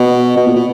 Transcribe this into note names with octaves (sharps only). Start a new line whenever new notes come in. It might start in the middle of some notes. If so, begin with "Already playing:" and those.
Already playing: B2
B2
A#2
B2